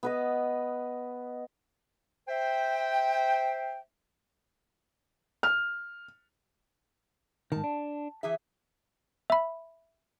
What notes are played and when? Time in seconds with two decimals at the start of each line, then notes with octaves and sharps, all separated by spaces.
0.03 B3 B4 D#5
2.28 C5 E5 G5
5.43 F6
7.52 G#2 D#3 A5
7.64 D4
8.23 E3 G#4 E5
9.30 E5 B5